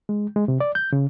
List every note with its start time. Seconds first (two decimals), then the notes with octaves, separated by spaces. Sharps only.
0.09 G#3
0.36 G#3
0.48 C3
0.60 D5
0.75 G6
0.93 C#3